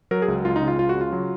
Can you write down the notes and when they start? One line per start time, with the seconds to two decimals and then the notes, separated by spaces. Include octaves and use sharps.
0.11 F#3 A#4
0.22 G#4
0.28 C#2
0.45 C#2 F4
0.56 D#4
0.62 C#3
0.68 F4
0.79 C#2 F4
0.89 F#4
0.95 C#3
1.01 F4
1.13 F#3